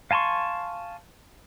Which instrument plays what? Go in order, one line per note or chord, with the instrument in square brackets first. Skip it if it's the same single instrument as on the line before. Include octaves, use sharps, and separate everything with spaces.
[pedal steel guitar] F5 G#5 A5 C6 C#6